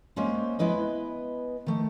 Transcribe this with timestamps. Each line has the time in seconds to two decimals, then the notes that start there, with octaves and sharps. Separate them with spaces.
0.16 G3 G#3 A#3 C#4 C5
0.59 G#3 B3 E4 B4 D#5
1.67 D#3 A3